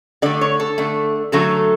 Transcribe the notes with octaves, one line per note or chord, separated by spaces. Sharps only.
D3 A3 D5
C#5
A4
D3 A3
D3 F#3 A3 A4